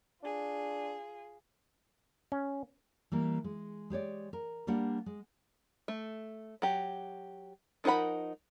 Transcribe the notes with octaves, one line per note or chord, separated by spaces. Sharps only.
D4 F4 G#4
C#4
E3 G3 A#3
G#3
G#3 G4 C#5 D5
A#4
G3 A#3 D4 G4 F#5
G#3
A3
F#3 G4
F3 D#4 A#4 F#5 B5